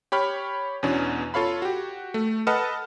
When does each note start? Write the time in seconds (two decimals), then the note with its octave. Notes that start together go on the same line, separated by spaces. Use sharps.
0.12 G4 C#5 B5 F6
0.83 E2 B2 C#4 D4
1.34 F4 A4 C#5 F5 B5
1.62 F#4 G4
2.14 A3
2.47 A4 B4 D#5 F#5 A5 F6